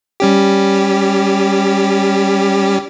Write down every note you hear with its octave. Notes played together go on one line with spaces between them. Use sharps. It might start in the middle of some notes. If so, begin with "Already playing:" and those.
G3 C#4 G4